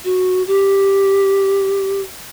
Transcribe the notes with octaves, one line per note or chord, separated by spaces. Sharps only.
F#4
G4